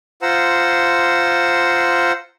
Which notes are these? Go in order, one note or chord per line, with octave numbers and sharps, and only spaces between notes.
F4 C5 F#5 A#5 E6